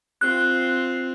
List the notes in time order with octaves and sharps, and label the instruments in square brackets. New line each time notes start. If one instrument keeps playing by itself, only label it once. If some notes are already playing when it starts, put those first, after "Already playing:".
[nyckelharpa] C4 F4 [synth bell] F#6